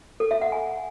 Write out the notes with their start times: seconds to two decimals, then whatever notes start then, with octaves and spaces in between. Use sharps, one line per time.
0.20 A4
0.31 E5
0.42 F#5
0.52 G#5